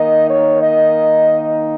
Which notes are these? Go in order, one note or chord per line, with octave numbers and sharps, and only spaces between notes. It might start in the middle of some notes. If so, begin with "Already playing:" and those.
Already playing: D#3 A#3 D#4 D#5
C#5
D#5